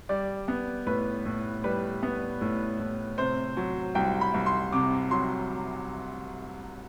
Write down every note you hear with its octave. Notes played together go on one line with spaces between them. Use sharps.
G3 D5
B3
A2 B4
A2
G3 B4
B3
A2
A2
C3 C5
F#3
C2 G5
B5
C2
C6
C3 D6
F#3 C6